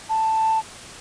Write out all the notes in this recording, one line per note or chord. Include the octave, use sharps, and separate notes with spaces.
A5